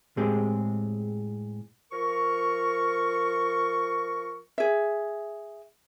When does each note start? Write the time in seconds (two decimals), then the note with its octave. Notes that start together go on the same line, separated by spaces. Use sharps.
0.17 A2 G#3 C4 G4 G#4
1.92 F3 A#4 C#6
4.58 G#4 E5